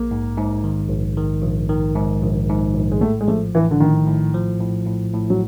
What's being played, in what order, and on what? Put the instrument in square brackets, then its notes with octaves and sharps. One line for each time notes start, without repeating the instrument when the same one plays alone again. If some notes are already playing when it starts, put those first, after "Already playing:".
Already playing: [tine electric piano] A#1 [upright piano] A#3
[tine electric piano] G#2
G#2
D#3
A#1
D#3
A#1
D#3
G#2
A#1
G#2
A#1
[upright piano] G#3
[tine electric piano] A2 [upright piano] A3
[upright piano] G#3
[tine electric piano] F3 [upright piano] A3
[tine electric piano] A2 [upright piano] E3
[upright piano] D3
[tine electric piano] A2 [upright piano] D#3
[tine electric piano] A2
F3
A2
A2
A2
[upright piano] F#3